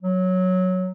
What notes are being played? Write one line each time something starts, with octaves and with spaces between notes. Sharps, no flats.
F#3